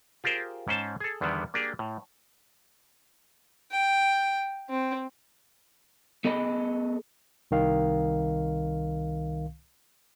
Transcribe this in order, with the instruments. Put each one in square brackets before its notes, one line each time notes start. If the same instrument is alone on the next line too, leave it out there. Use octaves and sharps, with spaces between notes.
[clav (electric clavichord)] F4 G4 G#4 A#4 C5
G#2 C#4 C5 A5
G#4 A4
E2 D3 D#3 G3 B3
A#3 D4 G4 G#4
A2
[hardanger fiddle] G5
C4
[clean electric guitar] B3 G#4 A4 D#5 B5
[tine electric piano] C2 D#3 F5